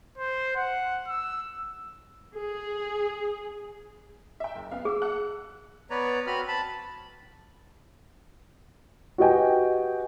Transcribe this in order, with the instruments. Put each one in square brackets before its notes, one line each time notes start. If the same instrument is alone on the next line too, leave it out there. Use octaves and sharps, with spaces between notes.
[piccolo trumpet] C5
F#5
E6
[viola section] G#4
[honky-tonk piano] E5 G5
F#1
B3 F5
[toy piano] G#4 [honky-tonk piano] D6 E6
[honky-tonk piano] F#5 A5 F#6
[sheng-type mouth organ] B3 B4 C#5 D5 A#5
C4 F#4 B4 B5 F6
A5 B5
[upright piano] F#4 G4 B4 D#5 G5 G#5